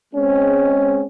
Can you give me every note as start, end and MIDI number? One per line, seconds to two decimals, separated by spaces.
0.14 1.04 56
0.14 1.04 60
0.14 1.04 61